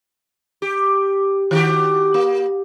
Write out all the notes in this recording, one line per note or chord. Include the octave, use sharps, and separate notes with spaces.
G4
D#3 F#4 G4
A#3